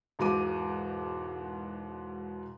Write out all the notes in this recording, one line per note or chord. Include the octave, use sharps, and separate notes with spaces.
E1 G#2 B2 F#4 D6 D#7